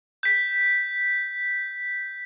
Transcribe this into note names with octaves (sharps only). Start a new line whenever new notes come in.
G6 B6